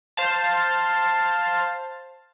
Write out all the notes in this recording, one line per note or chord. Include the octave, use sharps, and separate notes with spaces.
C5 F5 A5